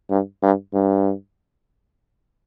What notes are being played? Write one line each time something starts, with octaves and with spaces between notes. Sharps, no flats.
G2
G2
G2